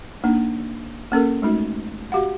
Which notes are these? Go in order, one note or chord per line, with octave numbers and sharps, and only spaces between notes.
A#3 D4 D#4
A#3 C#4 A4 A#4
G#3 A3 D#4 F#4
F#4 G4 F5 F#5